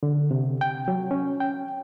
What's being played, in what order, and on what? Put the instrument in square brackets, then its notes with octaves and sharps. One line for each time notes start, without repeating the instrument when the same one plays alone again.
[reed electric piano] D3
C3
G5
F#3
C#4
G5